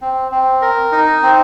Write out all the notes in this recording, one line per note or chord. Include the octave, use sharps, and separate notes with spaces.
C4
C4
A#4
D#4
C4